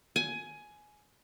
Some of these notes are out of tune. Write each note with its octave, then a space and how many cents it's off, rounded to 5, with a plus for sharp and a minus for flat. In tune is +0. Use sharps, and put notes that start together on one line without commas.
G#5 +15